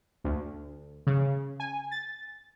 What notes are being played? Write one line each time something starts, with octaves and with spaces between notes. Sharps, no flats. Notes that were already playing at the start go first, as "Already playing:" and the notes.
D2
C#3
G#5
A6